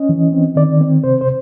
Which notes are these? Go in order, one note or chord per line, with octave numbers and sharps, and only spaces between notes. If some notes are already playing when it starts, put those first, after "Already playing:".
Already playing: C#4 D#5
E3
C4
D#3 D5
C4
C3 C5
C5